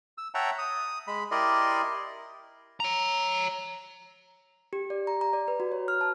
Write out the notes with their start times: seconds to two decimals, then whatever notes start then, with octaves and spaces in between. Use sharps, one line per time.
0.18 E6
0.34 C#5 E5 F#5 G5 A5 A#5
0.59 D#6
1.07 G#3 B5
1.31 E4 G4 A#4 D5 D#5 C6
2.80 C#5 A#5
4.73 G4
4.90 D5
5.07 A#5
5.21 A#5
5.33 D5
5.48 B4
5.60 F#4
5.72 C#5
5.88 F6
6.01 A5